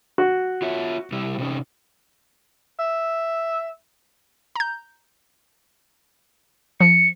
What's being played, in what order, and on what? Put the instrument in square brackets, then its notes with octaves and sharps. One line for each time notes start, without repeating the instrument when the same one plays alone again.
[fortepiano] F#4
[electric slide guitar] F4 C#5 E5
C3 G3 E4
C3 C#4 D#4
[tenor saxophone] E5
[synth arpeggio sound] A#5 G6
[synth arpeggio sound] F3 [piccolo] C#7